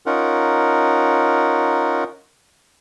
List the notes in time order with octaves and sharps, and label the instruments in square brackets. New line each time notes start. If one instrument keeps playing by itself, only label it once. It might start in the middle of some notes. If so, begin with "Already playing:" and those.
[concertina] C#4 D#4 F4 A#4 F#5